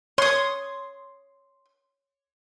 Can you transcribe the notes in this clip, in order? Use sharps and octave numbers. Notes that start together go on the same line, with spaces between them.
C#5 C6 D#6